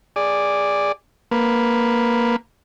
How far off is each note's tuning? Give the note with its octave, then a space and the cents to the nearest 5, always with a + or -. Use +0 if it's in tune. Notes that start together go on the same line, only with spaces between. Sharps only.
G#4 -20 D5 +0
A#3 +0 B4 +0